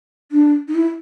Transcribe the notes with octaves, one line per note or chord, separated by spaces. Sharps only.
D4
D#4
E4